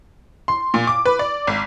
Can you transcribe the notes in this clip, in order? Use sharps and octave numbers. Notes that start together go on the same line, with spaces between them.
C6
A#2
D6
B4
D5
G#1